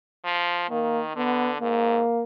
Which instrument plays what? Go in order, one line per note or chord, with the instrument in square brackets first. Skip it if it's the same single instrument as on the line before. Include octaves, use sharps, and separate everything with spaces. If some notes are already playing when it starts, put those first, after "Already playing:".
[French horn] F3
[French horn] D#3 [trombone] A#3
[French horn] D3 [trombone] B3
[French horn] G#2 [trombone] A#3